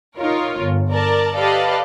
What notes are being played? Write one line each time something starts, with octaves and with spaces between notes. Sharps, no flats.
D#4 F4 A#4 C#5
G1
A#4 D5 A5
G4 A4 B4 D5 D#5 F5